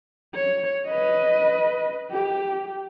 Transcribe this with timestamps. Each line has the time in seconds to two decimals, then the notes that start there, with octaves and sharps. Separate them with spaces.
0.35 C#5
0.87 B4 D#5
2.11 G4